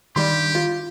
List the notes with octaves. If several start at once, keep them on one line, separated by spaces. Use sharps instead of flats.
G2 D#3 G3 G4 C6
F4